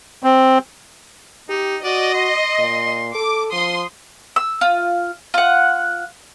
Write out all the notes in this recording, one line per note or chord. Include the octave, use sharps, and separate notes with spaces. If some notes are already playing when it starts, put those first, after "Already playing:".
C4
D#4 G4
F#4 D5 D#5
C6
A#2
A4 D6
F3 C6 D#6
E6
F4
F4 F#5